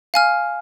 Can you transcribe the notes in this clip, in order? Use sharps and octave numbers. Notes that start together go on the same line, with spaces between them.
F5 G#5 F6